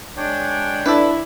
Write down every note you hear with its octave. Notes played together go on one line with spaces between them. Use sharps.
G#3 D4 C#5 G5
D4 E4 A4 B4 D5